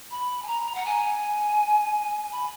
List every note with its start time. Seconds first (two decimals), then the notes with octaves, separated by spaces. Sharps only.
0.10 B5
0.42 G#5
0.47 A#5
0.74 F#5
0.85 G#5
2.32 B5